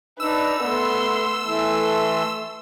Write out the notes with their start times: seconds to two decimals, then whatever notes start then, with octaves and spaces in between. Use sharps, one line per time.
0.20 D4 D#4 B4 E6
0.64 A3 B3 C6
1.45 E3 A3 A4 C6